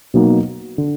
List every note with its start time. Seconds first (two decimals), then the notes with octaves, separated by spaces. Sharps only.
0.14 B2 F#3 A#3 D#4
0.78 D3